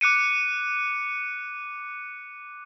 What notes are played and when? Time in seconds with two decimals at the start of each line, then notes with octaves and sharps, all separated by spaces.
0.01 D6 F#6 C#7 D#7